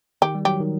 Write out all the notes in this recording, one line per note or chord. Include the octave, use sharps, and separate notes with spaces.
D#3 G4
G3
F#3 G4
D#3